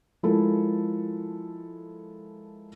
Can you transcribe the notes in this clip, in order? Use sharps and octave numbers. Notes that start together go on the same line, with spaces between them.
F3 G#3 E4 A4 A#4